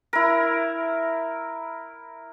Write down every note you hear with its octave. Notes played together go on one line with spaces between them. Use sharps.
E4 A#4